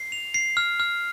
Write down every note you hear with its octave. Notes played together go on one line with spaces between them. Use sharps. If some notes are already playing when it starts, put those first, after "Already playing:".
Already playing: C7
F7
C7
F6
F6